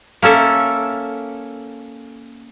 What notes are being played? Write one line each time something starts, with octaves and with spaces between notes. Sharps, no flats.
A#3 C#4 A4 E5